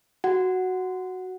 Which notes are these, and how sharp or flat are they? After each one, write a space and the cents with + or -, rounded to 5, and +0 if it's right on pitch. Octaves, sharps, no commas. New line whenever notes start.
F#4 +0 F#5 +0